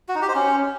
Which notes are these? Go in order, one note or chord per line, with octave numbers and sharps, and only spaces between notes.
F#4
D#4
G4
C5
C#4